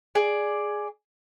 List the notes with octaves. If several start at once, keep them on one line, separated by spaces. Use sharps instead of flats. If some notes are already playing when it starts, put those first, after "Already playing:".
G#4 D5